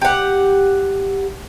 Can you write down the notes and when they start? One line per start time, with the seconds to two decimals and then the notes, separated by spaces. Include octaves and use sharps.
0.01 G4 F#5